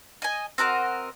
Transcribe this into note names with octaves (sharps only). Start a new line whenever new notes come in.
D#5 G#5
C4 F#4 A#4 D#5